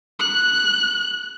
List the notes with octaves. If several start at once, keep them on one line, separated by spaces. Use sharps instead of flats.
F#6